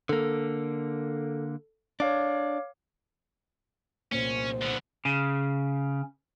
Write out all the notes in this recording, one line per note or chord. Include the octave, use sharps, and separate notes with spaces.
D3 A#3 A4
D4 C#5 F5 D6
C2 A#2 A#3 C#4 C5
D3 B3
C#3